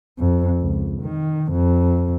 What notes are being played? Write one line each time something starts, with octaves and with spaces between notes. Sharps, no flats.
F2
C#2
D#3
F2